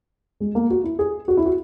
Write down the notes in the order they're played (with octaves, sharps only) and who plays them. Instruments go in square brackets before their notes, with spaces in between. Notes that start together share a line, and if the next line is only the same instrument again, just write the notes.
[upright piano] G#3
A#3
F#4
E4
G#4
F#4
E4
F#4